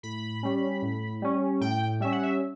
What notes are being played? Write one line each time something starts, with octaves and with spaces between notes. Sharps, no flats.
A2 B5
G3 C#4
A2
G3 C#4
A2 G5
G3 C#4 E5
F#5
E5